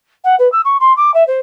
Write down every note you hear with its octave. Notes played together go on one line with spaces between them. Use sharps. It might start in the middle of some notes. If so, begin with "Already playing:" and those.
F#5
B4
E6
C#6
C6
D6
E5
C5